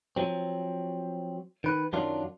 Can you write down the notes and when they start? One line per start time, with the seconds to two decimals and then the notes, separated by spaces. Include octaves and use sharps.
0.16 F3 F#3 C4
1.64 D#3 B4
1.93 F#2 D#3 F#3 D4 F4